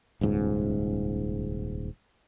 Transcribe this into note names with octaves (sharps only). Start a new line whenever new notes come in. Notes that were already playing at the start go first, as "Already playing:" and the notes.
D#1 C#2 G#2